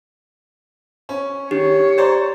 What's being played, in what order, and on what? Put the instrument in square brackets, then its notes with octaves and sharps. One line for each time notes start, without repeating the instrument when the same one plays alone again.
[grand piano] C#4
[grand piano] D#3 [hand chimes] G4 [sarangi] C#5
[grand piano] C5 D5 A#5